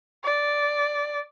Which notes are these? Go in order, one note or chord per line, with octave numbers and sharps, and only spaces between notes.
D5